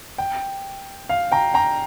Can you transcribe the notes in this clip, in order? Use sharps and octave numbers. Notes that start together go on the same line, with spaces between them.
G5
F5
G5 A#5
G5 A#5